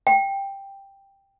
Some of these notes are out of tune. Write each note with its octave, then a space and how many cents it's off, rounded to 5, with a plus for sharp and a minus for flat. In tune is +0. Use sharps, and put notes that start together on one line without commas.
G5 +5